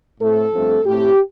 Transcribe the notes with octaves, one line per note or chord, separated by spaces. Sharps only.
A2 A3 C4 A4
G2 F3 A3 C4
A2 A3 C4 G4